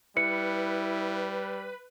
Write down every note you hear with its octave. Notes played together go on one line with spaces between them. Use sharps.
G3 E4 B4 C#7